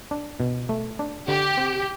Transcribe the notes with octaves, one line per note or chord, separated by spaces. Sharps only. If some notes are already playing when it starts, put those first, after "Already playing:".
D4
B2
A3
D4
D3 G4
C4